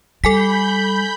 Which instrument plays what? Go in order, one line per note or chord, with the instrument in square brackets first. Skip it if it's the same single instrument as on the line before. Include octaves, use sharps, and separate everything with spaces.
[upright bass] G3 [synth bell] A4 G#5 B6 [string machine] B5 G6